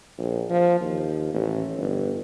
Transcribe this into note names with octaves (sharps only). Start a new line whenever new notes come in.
A#1
F3
D#2
A1
G1